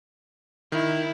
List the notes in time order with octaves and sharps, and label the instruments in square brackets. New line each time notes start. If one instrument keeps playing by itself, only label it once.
[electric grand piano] D#3 [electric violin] E4